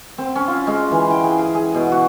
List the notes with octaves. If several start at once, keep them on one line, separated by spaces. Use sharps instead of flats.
C4
C#4
F4
G#3
E3
G5
G#4
G#4
G#4
B2
F#4